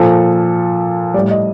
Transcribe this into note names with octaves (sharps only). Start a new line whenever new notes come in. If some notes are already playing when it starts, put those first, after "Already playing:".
Already playing: A#2 F3 A4
A2 G3 D5
D#5